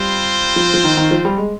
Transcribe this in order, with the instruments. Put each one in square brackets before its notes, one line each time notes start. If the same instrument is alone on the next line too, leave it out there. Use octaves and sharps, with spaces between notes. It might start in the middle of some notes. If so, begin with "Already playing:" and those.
Already playing: [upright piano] G3 [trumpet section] C4 F4 C5
[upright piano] F3
F3
D#3
D#3
F3
G3
G#3